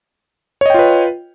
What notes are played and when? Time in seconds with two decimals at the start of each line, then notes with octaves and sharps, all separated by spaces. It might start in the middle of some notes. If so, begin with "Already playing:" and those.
0.61 C#5
0.66 D#5
0.70 G5
0.74 F4
0.79 B4